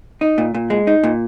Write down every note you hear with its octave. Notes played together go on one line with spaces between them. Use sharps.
D#4
A#2
A#2
G#3
D#4
A#2